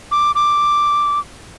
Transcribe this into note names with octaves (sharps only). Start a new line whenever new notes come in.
D6
D6